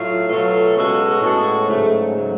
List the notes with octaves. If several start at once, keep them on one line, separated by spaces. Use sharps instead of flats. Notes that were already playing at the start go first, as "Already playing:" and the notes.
Already playing: A2 F#3 A3 F4
B2 F#3 A3 F4 A4
C#3 G#3 B3 F#4 A4
A2 C#3 G#3 B3 F#4 A4
G#2 C#3 F#3 A3
C#3 F#3 A3